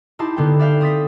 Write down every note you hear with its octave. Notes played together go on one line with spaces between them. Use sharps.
D#4 E4 G4 C5 A5
D3 B3 G5
D5 E5 F5 G5
C4 D#6 A6 B6